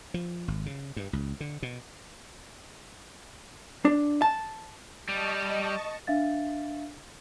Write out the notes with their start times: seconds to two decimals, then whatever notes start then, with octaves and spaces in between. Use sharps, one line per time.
0.14 F3
0.48 G#1
0.66 C#3
0.96 G2
1.13 C#2
1.40 D3
1.62 B2
3.85 D4
4.22 A5
5.09 G3 D#5 A5 C#6
6.07 D4 E5 F5 A6